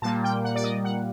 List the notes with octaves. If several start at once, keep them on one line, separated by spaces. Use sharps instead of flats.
A#2 G3 A#3 A5
G5
F#5
D5
D#5
F#5